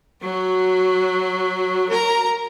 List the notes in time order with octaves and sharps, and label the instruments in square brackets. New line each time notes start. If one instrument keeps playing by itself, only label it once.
[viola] F#3 F#4
A#4 A#5